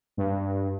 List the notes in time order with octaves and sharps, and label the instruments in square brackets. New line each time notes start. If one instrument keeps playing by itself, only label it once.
[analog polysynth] G2